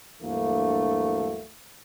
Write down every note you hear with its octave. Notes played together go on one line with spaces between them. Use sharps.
D2 G2 E3 F#3 A3 A#3